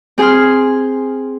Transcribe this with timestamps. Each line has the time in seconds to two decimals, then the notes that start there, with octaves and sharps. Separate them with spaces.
0.18 C4 G#4 G#5 C6 F6